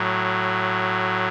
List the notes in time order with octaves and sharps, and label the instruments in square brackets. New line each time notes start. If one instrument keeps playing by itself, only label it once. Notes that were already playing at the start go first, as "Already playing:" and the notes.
Already playing: [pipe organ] A2 F#3